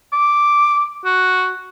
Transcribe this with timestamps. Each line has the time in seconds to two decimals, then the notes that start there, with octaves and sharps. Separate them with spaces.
0.13 D6
1.05 F#4